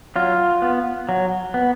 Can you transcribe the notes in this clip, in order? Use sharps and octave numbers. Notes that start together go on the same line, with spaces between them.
F#3 F4
B3
F#3
B3